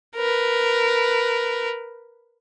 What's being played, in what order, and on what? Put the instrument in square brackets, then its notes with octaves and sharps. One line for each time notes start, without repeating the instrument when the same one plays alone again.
[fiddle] A#4 B4